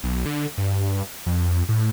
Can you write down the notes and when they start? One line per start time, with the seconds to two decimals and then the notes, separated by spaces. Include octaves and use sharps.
0.03 B1
0.25 D3
0.58 G2
1.26 F2
1.69 A2